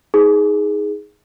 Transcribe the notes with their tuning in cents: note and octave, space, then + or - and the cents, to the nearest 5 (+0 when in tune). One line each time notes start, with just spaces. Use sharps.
D#4 +20 G#4 +0